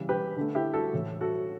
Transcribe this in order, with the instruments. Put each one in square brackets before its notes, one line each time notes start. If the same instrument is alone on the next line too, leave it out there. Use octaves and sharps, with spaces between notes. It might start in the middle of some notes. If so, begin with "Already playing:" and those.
Already playing: [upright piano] C#3 E3 G3
G4 B4
D3 A3
E4 G4
F#4 A4
A2 E3 A3
F#4 A4